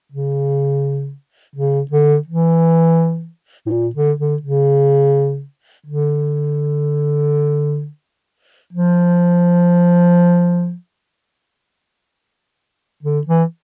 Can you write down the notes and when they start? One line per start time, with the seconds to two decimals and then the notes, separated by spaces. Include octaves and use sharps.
0.12 C#3
1.56 C#3
1.91 D3
2.28 E3
3.66 A2
3.70 A#2
3.95 D3
4.19 D3
4.43 C#3
5.86 D3
8.73 F3
13.03 D3
13.27 E3